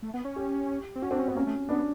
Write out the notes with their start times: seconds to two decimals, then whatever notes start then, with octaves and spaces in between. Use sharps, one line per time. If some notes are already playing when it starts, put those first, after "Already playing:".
0.03 A3
0.14 B3
0.25 C#4
0.36 G4
0.96 C4
1.02 C#4 F#4
1.11 C4 D4
1.19 C#4
1.28 B3 C4
1.35 A#3 C#4
1.47 A3
1.69 B3 D4